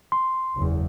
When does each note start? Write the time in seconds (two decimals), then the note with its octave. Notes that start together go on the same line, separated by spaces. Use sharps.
0.12 C6
0.56 F#1 E2